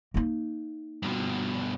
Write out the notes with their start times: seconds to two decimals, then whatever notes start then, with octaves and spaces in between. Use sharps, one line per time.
0.14 A#3 D#4
1.03 G2 B2